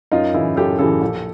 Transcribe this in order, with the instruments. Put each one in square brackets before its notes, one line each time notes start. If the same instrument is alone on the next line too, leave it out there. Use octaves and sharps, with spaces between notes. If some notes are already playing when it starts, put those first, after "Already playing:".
[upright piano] F#2 D#4 F4
C#3 E3 E4
F#2 G4 A4
C#3 E3 G4 A4
A#1